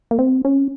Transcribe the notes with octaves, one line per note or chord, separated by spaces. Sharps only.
A#3
C4
C#4